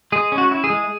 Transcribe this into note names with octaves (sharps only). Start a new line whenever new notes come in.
G#3 G#4
C#4
F#4
E4
G#4
G#3